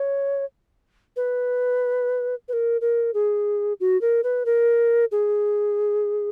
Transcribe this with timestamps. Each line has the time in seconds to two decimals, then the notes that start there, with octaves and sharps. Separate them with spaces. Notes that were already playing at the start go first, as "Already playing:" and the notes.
Already playing: C#5
1.16 B4
2.48 B4
2.53 A#4
2.81 A#4
3.14 G#4
3.80 F#4
4.01 A#4
4.24 B4
4.46 A#4
5.12 G#4